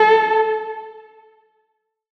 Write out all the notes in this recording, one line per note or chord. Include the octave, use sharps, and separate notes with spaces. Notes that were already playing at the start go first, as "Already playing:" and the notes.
Already playing: A4